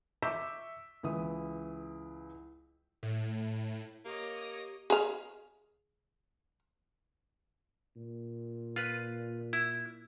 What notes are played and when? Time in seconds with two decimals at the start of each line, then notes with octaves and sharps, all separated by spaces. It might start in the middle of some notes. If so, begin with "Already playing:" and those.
0.23 E5 C#6 D6 E6 G6 B6
1.03 C#2 E3 D#6
3.03 A2
4.05 A#3 G4 C#5 D#5 D6
4.90 G#4 F5
7.97 A#2
8.76 F4 B4
9.53 E4